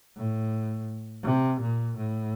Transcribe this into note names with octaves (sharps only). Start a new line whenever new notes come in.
A2
C3
A#2
A2